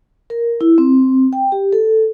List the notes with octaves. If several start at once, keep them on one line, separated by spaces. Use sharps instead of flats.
A#4
E4
C4
G5
G4
A4